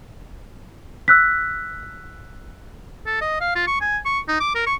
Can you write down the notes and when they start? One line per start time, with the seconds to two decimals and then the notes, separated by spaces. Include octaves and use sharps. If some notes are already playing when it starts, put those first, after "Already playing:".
1.08 E6 F#6 B6
3.06 A4
3.21 D#5
3.41 F5
3.55 F4
3.67 C#6
3.81 G#5
4.05 C#6
4.28 D#4
4.40 D6
4.55 A#4
4.66 C#6